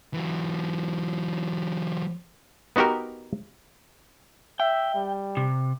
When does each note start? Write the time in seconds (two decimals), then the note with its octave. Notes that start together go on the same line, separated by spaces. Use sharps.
0.14 E3 F#3
2.76 B3 D#4 F#4 G4 A#4
4.60 E5 G5
4.95 G3
5.37 C3